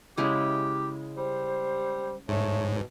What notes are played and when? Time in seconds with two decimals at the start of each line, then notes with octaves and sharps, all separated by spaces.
0.17 C#3 G#3 E4 G4
1.17 G3 C5
2.28 G#2 A3 C#5
2.74 B2